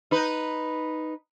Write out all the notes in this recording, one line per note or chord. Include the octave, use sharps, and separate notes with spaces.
D#4 B4